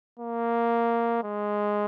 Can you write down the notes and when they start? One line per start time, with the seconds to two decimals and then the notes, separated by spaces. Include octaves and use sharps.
0.19 A#3
1.23 G#3